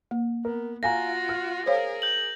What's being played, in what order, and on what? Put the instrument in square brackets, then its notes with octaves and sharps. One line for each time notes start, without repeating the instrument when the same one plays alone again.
[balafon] A#3
[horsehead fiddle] B3 [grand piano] A#4
[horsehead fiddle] F4 F#4 [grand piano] F5 G#5 A#5 [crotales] A#6
[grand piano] F6
[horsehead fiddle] G#4 A#4 [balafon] C5 C#5 F5
[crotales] G6 F#7